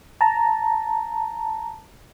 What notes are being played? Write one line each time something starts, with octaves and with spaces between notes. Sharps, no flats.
A5 A#5